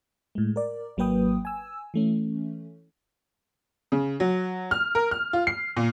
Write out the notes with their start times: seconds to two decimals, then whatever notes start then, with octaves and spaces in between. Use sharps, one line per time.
0.35 A2 G#3
0.56 A#4 D5
0.97 G#1 F#3 A#3 B4 G5 D#6
1.45 G#5 E6
1.94 E3 A3 C#4
3.92 C#3
4.20 F#3
4.71 F6
4.95 A#4
5.11 F6
5.33 F4
5.47 C7
5.77 A#2